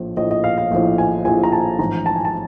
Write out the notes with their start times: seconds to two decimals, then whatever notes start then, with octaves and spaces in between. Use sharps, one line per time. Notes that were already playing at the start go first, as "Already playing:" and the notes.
Already playing: A#1 A2 F3
0.17 A#1 A2 F3 D#5
0.31 D#5
0.44 F5
0.58 F5
0.71 A#1 A2 F3
0.98 G#5
1.25 A#1 A2 F3 G#5
1.43 A#5
1.52 A5
1.79 A1 G#2 F3 A#5
2.06 A5
2.16 G#5
2.25 A5